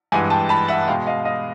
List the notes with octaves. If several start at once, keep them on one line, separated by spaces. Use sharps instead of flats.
G2 E3 G#3 F#5 G#5
G5 A5
A5 B5
E5 F#5
B2 G#3 F5 G5
D#5 F5
D#5 F5